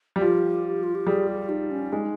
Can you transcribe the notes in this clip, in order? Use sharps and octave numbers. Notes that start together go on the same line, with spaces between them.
G3
F3 G4
F4
G4
G3 G#4
G4
D#4
C#4
G#3 D#4